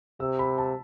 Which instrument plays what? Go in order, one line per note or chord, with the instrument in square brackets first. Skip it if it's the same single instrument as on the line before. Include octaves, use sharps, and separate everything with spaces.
[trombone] C3 [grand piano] E6
[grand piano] B5
A5